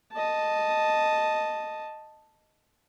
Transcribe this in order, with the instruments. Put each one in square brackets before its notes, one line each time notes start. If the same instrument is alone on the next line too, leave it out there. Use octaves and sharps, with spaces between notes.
[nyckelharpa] D#5 A5